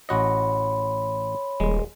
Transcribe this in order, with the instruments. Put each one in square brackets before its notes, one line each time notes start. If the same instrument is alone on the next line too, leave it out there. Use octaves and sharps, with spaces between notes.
[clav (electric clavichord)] A1 F#4 D#5 [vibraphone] C#5 B5 C6
[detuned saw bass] D#1 [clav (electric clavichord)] G#3